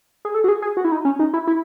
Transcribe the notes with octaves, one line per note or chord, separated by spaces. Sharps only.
G#4
A4
F#4
G#4
G#4
F#4
E4
D#4
C#4
D#4
E4
E4